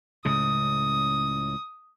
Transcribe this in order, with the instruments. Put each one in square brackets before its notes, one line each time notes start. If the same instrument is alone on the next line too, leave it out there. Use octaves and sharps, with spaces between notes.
[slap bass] C#2 A2 C#3 [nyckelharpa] D#6